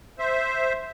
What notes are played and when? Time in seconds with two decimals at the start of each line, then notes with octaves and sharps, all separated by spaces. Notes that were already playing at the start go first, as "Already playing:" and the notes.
0.19 C5 E5